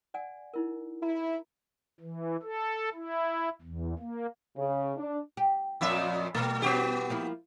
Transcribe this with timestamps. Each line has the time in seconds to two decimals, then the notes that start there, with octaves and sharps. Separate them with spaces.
0.14 D5 F#5 G#5
0.54 D#4 E4 A#4
1.03 E4 A#5
2.01 E3
2.42 A4
2.94 E4
3.62 E2
3.99 A#3
4.56 C#3
4.96 D4
5.37 G4
5.81 F2 A#2 E5
6.35 B2 E3 G3 A3
6.62 B3 F#4 G4
7.10 F3 A#3 E4